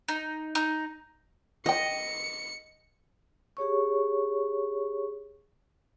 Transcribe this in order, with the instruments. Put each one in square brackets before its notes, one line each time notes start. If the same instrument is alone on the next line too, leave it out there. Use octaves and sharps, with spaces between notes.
[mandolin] D#4
D#4
[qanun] D#5 [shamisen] F#5 G5 [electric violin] C#7
[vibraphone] G4 G#4 C#5 C#6